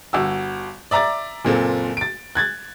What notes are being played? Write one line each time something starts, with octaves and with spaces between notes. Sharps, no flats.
G1 F#4 E6
D5 E5 A#5 D6 A6
F#1 A#2 C4 A4
A6 D7
F#6 G#6 A6